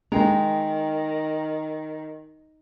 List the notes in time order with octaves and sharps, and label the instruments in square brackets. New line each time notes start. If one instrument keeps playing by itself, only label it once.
[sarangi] D#3 [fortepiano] G#3 [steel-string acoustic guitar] G5 A#5